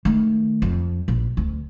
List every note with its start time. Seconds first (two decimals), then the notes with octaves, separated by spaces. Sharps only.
0.05 D#3 A3
0.62 F2
1.08 A#1
1.37 D2